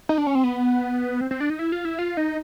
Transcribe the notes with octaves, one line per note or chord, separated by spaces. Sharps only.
D#4
D4
C#4
C4
B3
C4
C4
D4
D#4
E4
F4
E4
F4
D#4